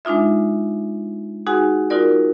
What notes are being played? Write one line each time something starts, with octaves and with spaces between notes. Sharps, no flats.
G#3 D4 D#4 F4 E5
D#4 F#4 G#4 F#5 G#5
D#4 F4 F#4 A#4 D5